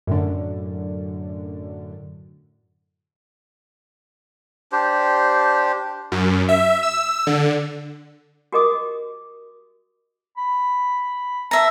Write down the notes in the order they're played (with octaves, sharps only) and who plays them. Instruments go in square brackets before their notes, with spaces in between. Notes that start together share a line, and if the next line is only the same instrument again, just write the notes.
[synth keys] F#2 A2 D3
[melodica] D4 G4 C5
[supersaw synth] F#2
E5
E6
D3
[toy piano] F#4 G4 A#4 D#5 D6 D#6
[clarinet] B5
[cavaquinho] E5 A#5 [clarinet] A5